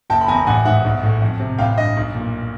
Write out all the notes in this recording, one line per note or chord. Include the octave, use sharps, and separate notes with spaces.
F#1 G5 A5
B5
E2 G#5 A#5
A1 F#5 G#5
G#2 E5 F#5
B1
A2
F2
C3
A1 F5 G5
G2 D#5
B1
A#2